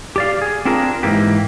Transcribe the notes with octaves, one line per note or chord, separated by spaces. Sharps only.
G4 D5 F5
G#4
C4 D4 F4 G#4 A#4
G#2 C3 E3 A#3 G4